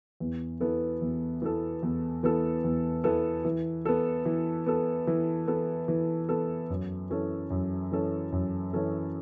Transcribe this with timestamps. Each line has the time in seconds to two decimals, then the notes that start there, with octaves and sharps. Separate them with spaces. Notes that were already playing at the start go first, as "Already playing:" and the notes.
0.20 E2
0.60 E3 B3 A4
1.02 E2
1.42 E3 B3 A4
1.83 E2
2.23 E3 B3 A4
2.64 E2
3.04 E3 B3 A4
3.45 E3
3.85 B3 A4
4.25 E3
4.66 B3 A4
5.07 E3
5.47 B3 A4
5.88 E3
6.29 B3 A4
6.70 F#2
7.10 E3 C#4 A4
7.50 F#2
7.92 E3 C#4 A4
8.32 F#2
8.73 E3 C#4 A4